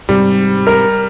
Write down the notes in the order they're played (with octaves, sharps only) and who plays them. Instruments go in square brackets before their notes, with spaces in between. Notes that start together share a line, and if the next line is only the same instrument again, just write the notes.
[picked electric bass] G#2 C3 [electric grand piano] G3
[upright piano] A#4